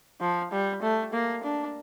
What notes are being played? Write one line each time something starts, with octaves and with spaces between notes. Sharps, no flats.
F3
G3
A3
A#3
D4